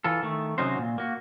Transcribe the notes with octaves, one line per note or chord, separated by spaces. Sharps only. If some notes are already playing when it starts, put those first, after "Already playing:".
E3 F4 A4
D#3 A3
C3 F#3 C#4 D#4 F#4 C5
A#2
A#3 F#4